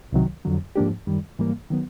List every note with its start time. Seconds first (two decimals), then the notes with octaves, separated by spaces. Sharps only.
0.12 C2 C3 D#3 F#3
0.45 F2 D3 F#3
0.76 G#2 F3 A#3 D4 G4
1.07 F#2 D#3 G3
1.38 G#2 E3 G3 A#3
1.71 D#3 F#3 B3